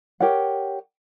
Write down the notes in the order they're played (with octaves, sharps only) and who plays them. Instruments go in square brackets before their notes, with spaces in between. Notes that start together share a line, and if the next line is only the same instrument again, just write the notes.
[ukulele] G4 A#4 C#5 F#5